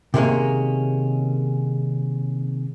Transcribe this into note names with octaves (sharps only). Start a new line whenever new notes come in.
C3 D#3 G3 G#3 A#3 C#4